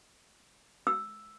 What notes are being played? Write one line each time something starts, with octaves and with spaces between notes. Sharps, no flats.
E6